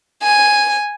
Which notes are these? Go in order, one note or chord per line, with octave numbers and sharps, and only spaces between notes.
G#5